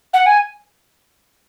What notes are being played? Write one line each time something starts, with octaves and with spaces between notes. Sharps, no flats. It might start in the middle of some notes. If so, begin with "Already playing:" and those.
F#5
G#5